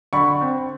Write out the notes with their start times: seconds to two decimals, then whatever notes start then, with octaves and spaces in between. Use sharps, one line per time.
0.13 D3 B5 C#6
0.41 C4